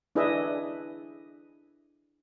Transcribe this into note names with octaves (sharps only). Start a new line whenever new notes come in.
D4 E4 G#4 B4 D#5 E5